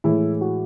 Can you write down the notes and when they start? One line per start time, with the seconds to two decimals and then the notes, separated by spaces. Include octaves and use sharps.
0.04 A2 E3 G#3 E4
0.41 F#4